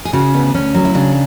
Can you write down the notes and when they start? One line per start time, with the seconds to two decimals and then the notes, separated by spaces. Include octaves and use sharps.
0.05 G#4
0.13 C#3 F#4
0.34 D2 B3
0.54 D2 C#4
0.74 F#3
0.85 E4
0.95 C#3 D4